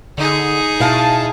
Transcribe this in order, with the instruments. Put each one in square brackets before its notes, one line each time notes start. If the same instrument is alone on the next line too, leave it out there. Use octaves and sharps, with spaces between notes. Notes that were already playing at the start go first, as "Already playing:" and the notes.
[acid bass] D3 [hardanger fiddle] D#4 G#4
[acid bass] B2 [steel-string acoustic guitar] E4 F5 G#5 [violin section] A5